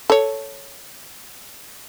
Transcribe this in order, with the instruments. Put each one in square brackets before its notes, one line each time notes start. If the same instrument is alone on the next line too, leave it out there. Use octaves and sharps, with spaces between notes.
[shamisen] A4 C#5